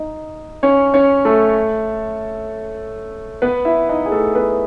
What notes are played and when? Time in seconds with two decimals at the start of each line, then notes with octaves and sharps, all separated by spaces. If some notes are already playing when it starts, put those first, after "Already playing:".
Already playing: D#4 D#5
0.63 C#4 C#5
0.94 C#4 C#5
1.25 A3 A4
3.42 B3 B4
3.65 E4 E5
3.89 D#4 D#5
4.06 G#4
4.12 A3 A4
4.35 B3 B4